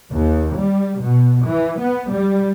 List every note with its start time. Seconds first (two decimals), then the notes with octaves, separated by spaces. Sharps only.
0.11 D#2
0.57 G3
1.01 B2
1.45 E3
1.80 B3
2.11 G3